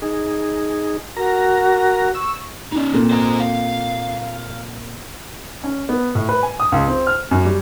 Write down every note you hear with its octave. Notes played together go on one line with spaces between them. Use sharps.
D#4 G#4
F#4 A#4 A#5
C#6 E6
C#4 D#4
A#2 C4 A4
C5 G#5 A#5
F5
C#4
B3
A2
B4
G#5
D#6
C#2
C4
F6
F#2
G3